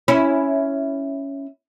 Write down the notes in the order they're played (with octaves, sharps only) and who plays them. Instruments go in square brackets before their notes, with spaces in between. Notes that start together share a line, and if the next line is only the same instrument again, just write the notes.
[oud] C#4 E4